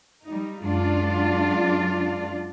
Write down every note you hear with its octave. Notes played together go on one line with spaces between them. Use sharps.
G3 D#4
F#2 G#3 D4 F4 D5